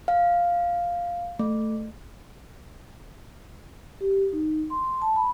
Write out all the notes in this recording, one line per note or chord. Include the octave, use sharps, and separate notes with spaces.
F5
A3
G4
D#4
C6
A5
B5